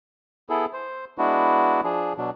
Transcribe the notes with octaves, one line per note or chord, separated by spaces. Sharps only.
B3 E4 G#4 A4
C5
G#3 B3 D4 E4 F#4
F3 D4 G#4
B2 F#3 D4